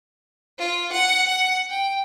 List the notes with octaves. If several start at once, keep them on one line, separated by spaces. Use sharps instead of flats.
F4
F#5
F#5
G5